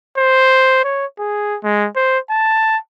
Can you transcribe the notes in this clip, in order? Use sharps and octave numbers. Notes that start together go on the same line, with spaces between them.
C5
C#5
G#4
G#3
C5
A5